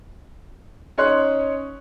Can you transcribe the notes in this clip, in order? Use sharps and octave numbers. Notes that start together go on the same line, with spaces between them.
C#4 D#4 C#5 C6 F#6